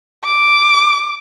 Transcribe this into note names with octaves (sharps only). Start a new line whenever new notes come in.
D6